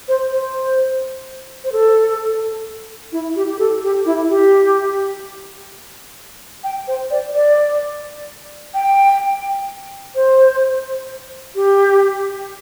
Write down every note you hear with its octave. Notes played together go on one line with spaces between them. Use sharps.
C5
C5
C5
A4
E4
G4
G4
A4
G4
E4
G4
G5
C5
D5
D5
G5
C5
G4